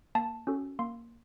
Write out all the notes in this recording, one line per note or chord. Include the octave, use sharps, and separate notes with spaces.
A#3 A5
C#4 F#4 A4
A#3 C6